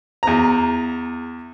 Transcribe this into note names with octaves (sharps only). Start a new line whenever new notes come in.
E2 A#5